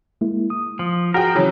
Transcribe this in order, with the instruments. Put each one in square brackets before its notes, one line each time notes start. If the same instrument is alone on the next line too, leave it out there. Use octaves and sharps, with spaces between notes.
[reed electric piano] G#3 A#3 E4
D#6
[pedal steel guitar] F3
[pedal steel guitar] F3 A#4 [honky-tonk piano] F#4 G#4 G5
[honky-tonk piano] C#3 E3 F#3